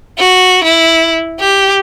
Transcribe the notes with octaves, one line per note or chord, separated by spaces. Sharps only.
F#4
E4
G4